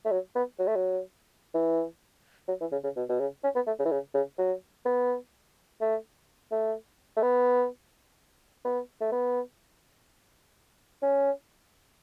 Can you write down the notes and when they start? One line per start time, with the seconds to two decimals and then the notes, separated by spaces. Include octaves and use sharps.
0.05 A3
0.11 F#3
0.36 B3
0.59 F#3
0.67 A3
0.76 F#3
1.55 E3
2.48 F#3
2.61 E3
2.72 C#3
2.84 C#3
2.96 B2
3.09 B2
3.20 C#3
3.44 C#4
3.56 B3
3.67 A3
3.80 C#3
3.86 E3
3.91 C#3
4.14 C#3
4.38 F#3
4.86 B3
5.81 A3
6.52 A3
7.17 A3
7.23 B3
8.65 B3
9.01 A3
9.12 B3
11.02 C#4